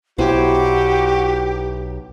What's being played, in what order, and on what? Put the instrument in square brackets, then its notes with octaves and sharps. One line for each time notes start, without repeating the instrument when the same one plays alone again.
[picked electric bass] B1 [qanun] E4 C5 G#5 [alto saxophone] F#4 [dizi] G4